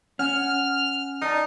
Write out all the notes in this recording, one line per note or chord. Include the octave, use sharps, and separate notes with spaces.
C#4 F#5 G#5 F6 E7
D#4 A#4 D5 A5